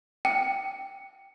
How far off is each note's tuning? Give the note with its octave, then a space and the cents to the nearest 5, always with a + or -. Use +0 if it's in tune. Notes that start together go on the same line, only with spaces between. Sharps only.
G5 -5